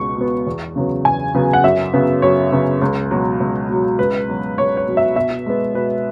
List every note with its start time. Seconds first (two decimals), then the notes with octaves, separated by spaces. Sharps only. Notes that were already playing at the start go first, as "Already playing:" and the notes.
Already playing: C#2 B2 C#6
0.16 B2 B3
0.47 E2
0.76 C#3 F#3 B3
1.05 E2 G#5
1.34 C#3 F#3 B3
1.53 F#5
1.64 F#2 E5
1.93 C#3 F#3 B3
2.22 F#2 C#5
2.52 C#3 F#3 B3
2.82 C#2
3.11 B2 F#3
3.40 C#2
3.69 B2 F#3
3.99 C#2 B4
4.28 B2 F#3
4.58 C#2 C#5
4.77 C#5
4.87 B2 F#3
4.97 E5
5.16 B2 E5
5.46 G#3 B3
5.74 B2 B4